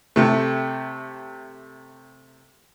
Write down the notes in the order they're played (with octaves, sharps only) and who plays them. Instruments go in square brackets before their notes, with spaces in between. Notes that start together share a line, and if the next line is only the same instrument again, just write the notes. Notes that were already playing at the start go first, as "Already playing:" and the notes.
[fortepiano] C3 A3